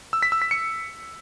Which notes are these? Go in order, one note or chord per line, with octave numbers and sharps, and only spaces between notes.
E6
B6
E6
B6
C#7